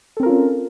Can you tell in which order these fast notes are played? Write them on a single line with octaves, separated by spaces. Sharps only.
A4 C4 A#4 F4 C#4